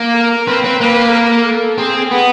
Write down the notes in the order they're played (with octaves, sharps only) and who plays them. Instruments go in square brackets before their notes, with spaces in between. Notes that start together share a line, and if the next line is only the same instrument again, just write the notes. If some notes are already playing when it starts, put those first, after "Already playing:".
Already playing: [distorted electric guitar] A#3
[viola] A#4
[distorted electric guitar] C4 [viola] B4
[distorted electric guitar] C4
[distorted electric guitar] A#3 [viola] B4
[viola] A#4
A4
[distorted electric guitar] C4 [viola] G#4
[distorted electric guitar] B3